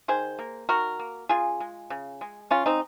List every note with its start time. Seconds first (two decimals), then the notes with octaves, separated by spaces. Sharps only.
0.08 D#3 G#4 C5
0.39 A#3
0.69 D#3 F#4 A#4
0.99 A#3
1.29 C#3 F4 G#4
1.60 G#3
1.90 C#3
2.21 G#3
2.50 C#3 C#4 F4
2.66 C4 D#4